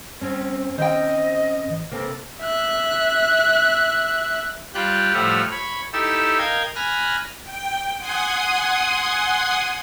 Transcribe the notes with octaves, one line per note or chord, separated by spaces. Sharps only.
G2 C4 C#4
D#3 C5 D#5 G5
G#1 E3
C3 A#3 C4 A4
E5 F#6
G3 F4 G4 G5 F#6
A2 F3 G3 E5 F#5 F6
C#5 B5
D#4 E4 G4 A4 E6
A#4 D#5 F5 G5 G#6
G#5 B5 F6 F#6 A#6
G5
F#5 G#5 C6 D#6